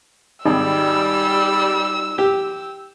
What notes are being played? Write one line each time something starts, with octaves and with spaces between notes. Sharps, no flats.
G#1 G3 D#4 E6
G4